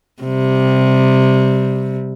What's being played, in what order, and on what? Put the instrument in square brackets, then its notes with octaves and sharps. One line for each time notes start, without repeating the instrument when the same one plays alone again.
[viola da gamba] C3 G3